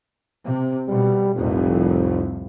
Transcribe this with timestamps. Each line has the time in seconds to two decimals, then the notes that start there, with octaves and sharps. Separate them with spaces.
0.44 C3
0.88 B1 B2 G3
1.36 F1 C2 F2 A2